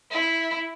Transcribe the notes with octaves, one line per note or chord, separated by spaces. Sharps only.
E4